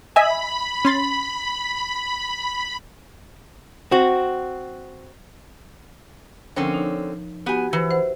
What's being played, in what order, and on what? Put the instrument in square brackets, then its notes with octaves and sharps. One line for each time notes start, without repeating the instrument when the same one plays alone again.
[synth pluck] D#5 E5 G#5 [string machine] B5
[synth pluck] C#4 C6 A6
[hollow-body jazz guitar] C4 F#4
[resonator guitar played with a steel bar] D3 C4 C#4 [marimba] F3 A#4 C#5
[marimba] D#4
[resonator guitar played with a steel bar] B3 G#5 [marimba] F#4 G4
[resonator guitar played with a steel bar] E3 [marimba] B4 C5
[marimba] C5 F#5